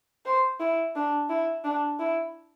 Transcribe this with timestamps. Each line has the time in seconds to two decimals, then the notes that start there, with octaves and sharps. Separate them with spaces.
0.25 C5
0.60 E4
0.95 D4
1.29 E4
1.64 D4
1.99 E4